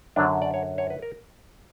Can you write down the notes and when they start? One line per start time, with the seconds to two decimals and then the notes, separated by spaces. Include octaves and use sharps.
0.16 F#2 D3 F#3 D4
0.42 D5
0.54 C#5
0.78 C#5
0.90 B4
1.02 A#4